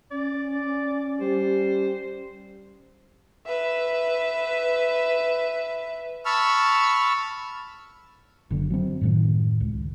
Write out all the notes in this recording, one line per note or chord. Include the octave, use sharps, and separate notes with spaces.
C#4 D5
G3 C5
B4 E5
A5 B5 C#6 E6 F6
F#1 F#2 D3
F#3 B3 C4
F#2 A2 D#3
C#2